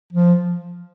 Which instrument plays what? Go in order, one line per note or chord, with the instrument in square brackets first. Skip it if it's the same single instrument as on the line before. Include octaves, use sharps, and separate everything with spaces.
[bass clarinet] F3